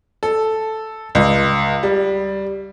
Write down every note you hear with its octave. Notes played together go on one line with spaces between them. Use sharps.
A4
C#2
G3